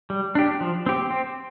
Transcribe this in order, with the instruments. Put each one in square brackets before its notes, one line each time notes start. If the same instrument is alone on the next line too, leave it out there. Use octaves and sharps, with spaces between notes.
[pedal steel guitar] G3
D4 G4
F3
C4 G4
C4